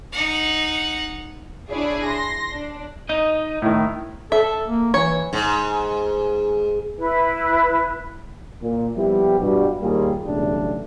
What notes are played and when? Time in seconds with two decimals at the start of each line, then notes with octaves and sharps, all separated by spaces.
0.12 D#4 F#5
1.69 D4 E4 G#4 C#5 D5
2.06 C6 A#6
2.51 D4
3.09 D#4 D#5
3.62 A2 D#3
4.32 A4 E5
4.67 A#3
4.94 E3 C#5
5.33 G#2
6.97 E4 B4
8.62 A#2
8.96 F3 G3 B3 E4 G4
9.40 G2 B2 G3
9.82 D#2 G3 A#3 F4 G#4
10.26 B1 E2 C#3 G3 A3 D4